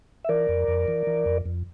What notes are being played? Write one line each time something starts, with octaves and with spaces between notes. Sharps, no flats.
E5
E3 A#4 D5
F2
F2
E3
E3
F2
F2